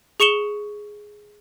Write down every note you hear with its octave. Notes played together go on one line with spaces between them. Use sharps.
G#4 C#6 C#7 E7 G7